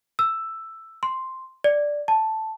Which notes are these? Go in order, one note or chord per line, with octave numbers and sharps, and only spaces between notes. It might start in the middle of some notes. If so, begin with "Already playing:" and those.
E6
C6
D5
A5